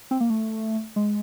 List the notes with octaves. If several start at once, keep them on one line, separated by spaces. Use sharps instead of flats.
C4
A#3
A3
G#3